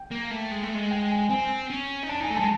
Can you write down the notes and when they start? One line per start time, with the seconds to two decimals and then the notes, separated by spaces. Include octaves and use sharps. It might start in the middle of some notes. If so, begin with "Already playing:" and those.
Already playing: G5
0.11 A#3
0.31 A3
0.51 G#3
0.63 A3
0.75 G#3
0.91 G5
1.11 G#5
1.30 C4 G#5
1.70 C#4
2.03 D#4
2.09 D4 A5
2.20 D#4 G#5
2.30 A3
2.37 A5
2.39 G#3